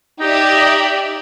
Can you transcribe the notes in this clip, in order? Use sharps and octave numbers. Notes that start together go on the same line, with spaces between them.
D#4 G4 D5 E5